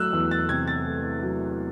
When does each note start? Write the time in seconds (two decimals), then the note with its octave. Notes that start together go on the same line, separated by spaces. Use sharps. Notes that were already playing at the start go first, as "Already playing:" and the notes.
Already playing: F#3 A3 E6 F#6
0.13 E2
0.31 A6
0.49 C3 G#6
0.67 A6
0.86 A3
1.22 F#3